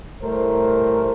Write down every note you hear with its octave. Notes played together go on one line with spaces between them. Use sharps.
A2 G3 A3 A#4 C5